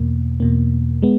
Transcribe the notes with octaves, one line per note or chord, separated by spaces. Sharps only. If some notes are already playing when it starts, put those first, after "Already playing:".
Already playing: E2 B2 A#3
E2 B2 A#3
G#3 B3